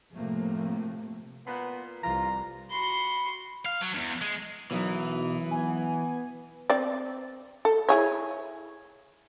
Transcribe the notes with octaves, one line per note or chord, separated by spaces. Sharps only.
A2 C3 F3 A3 A#3
A#2 B3 B4 C6
C2 F4 A#5
F#4 B5 C6
F5
F#3
E2 G2
G#3
B1 F#2 B2 E3 D#4
B3 G#5
C4 D5
A4
E4 G#4 C#5